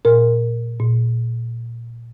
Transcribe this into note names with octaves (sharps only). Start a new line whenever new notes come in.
A#2 A#4
A#2